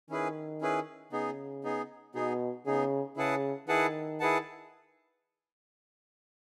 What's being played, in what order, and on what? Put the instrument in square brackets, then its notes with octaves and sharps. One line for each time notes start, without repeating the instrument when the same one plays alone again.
[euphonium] D#3 [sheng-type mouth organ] C#4 E4 G#4 B4
[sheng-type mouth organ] C#4 E4 G#4 B4
[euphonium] C#3 [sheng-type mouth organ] B3 D#4 G#4
[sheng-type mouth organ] B3 D#4 G#4
[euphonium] B2 [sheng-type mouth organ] B3 D#4 G#4
[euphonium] C#3 [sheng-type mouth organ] B3 D#4 G#4
[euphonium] C#3 [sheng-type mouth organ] E4 G#4 B4 F#5 A5
[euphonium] D#3 [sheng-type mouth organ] E4 G#4 B4 F#5 A5
[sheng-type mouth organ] E4 G#4 B4 F#5 A5